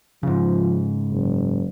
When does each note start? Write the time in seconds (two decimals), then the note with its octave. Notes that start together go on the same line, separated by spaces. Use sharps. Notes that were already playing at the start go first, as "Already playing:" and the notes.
0.23 G#2 C#3 F3
1.11 F#1